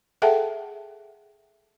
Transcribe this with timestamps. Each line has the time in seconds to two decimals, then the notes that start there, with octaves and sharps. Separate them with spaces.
0.22 G#4 A4 E5 F#5 G5 A5